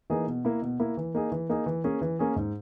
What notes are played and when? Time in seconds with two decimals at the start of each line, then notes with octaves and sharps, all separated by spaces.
0.10 E3 A#3 D#4 G#4
0.28 B2
0.45 A#3 E4
0.62 B2
0.80 A#3 E4
0.97 E3
1.15 A#3 D#4 G#4
1.32 E3
1.49 A#3 D#4 G#4
1.66 E3
1.84 A#3 C#4 G#4
2.01 E3
2.19 A#3 C#4 G#4
2.36 G#2